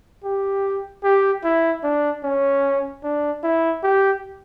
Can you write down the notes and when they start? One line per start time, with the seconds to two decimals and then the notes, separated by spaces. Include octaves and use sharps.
0.24 G4
1.04 G4
1.44 E4
1.84 D4
2.24 C#4
3.04 D4
3.43 E4
3.83 G4